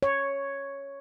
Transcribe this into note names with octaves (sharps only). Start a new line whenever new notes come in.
C#5